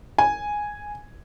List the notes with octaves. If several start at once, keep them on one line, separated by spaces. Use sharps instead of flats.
G#5